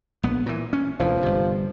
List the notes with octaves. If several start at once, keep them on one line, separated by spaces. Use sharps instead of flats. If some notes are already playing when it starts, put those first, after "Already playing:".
A#1 B3
A#2 E3
C#4
E1 D2 E3 F3
G1 C3